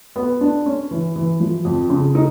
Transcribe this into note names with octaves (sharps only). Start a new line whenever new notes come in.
B3
D4
C#4
E3
E3
F3
F2
C#3
D#4